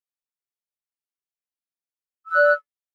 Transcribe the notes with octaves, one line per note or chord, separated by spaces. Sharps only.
D5 E6 F#6